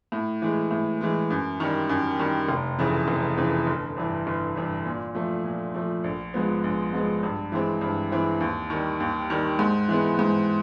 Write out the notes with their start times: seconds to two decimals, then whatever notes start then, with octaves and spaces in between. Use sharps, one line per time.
0.12 A2
0.42 E3 G#3
0.71 A2
1.01 E3 G#3
1.30 F#2
1.60 D#3 G3
1.89 F#2
2.19 D#3 G3
2.49 F1
2.78 F2 C#3 E3
3.08 F1
3.37 F2 C#3 E3
3.67 G1
3.97 G2 E3
4.27 G1
4.56 G2 E3
4.85 A#2
5.15 F3 A3
5.45 A#2
5.74 F3 A3
6.04 A#1
6.34 G#2 F3 G#3 B3
6.64 A#1
6.93 G#2 F3 G#3 B3
7.23 G2
7.52 E3 G#3 C4
7.81 G2
8.12 E3 G#3 C4
8.40 D#2
8.70 D#3 G3
9.00 D#2
9.30 D#3 G3
9.59 G#2
9.88 E3 G#3 B3
10.19 G#2